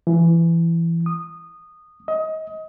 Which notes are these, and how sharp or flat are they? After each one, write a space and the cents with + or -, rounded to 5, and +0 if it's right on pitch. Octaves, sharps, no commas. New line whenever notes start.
E3 +20
D#6 -15
D#5 +25